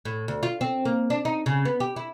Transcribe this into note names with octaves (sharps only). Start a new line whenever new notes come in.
A2
D2
F4
C4
A#3
D4
D#4
C#3
B3
G4
E4